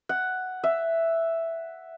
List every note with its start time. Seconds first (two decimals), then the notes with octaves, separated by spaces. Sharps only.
0.09 F#5
0.64 E5